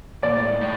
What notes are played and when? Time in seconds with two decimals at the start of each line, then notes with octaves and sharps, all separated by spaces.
0.23 A#2 D5
0.36 A2
0.48 G#2
0.61 A2